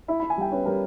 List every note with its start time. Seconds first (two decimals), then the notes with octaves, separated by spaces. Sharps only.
0.08 E4 B5
0.20 E4 B5
0.30 G#5
0.38 G3 G5
0.52 C#4 B4
0.66 G3 A#4